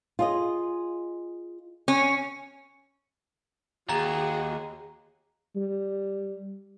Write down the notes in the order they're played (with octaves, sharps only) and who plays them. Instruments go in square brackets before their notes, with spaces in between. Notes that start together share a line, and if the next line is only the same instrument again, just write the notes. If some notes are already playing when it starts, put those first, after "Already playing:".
[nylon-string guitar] F4 G#4 D#5
[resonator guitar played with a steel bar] C#4
[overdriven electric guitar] D#2 [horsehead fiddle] F#4 G#4 [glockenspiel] A#5
[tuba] G3